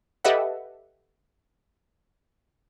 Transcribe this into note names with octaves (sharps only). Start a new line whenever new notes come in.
G4 A4 B4 D#5 E5 F#5